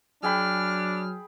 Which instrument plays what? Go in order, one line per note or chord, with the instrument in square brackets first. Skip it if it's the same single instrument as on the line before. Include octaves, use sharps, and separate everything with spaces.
[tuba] F#3 [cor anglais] D4 [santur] G#4 G5 B5 [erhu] F6